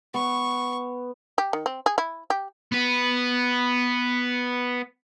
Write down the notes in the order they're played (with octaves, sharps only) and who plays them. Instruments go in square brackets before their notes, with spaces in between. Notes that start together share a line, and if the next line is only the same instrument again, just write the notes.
[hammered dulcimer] B3 [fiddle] C#6
[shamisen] G4
D#3
C4
G#4
E4
G4
[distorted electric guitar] B3 B4